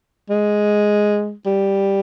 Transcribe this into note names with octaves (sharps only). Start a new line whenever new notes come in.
G#3
G3